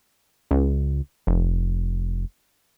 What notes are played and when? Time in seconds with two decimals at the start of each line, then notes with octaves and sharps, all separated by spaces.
0.51 C#2
1.27 F1